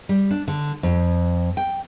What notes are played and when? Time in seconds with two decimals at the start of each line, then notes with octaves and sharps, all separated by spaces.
0.09 G3
0.31 D4
0.48 D3
0.83 F2
1.57 G5